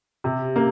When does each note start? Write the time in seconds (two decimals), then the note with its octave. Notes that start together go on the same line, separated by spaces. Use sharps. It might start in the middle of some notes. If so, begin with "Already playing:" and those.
0.24 C3
0.56 A#3